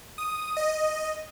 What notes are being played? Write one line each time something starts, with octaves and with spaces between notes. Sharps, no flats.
D#6
D#5